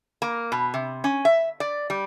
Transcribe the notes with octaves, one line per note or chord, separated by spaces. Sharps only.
A#3
B2
C3
C#4
E5
D5
G3